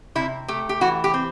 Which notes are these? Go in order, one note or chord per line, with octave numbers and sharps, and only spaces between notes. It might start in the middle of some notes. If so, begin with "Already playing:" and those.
C3 E4
A3 G4
G4
E3 F#4
G4
C4